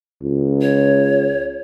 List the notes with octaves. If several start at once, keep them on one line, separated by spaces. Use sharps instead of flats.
C#2
C#5